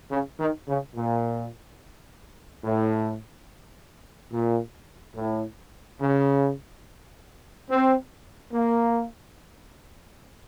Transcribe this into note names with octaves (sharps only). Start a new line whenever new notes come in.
C#3
D#3
C#3
A#2
A2
A#2
A2
C#3
C4
A#3